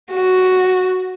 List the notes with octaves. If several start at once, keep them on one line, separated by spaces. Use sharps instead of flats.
F#4